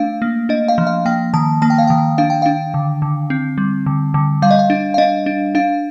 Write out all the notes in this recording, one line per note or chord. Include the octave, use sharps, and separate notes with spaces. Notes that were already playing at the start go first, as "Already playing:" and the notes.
Already playing: A3 D4 F5
A#3
D4 D#5
F5
F3
F5
A#3 G5
D#3 A5
A#3 A5
G5
F5
D#3 G5
D4 F5
G5
D4 F5
D3
D3
C4
G3
D3
D3
G3 F5
D#5
F5
D4
F5
D4 D#5
D4
D4 F5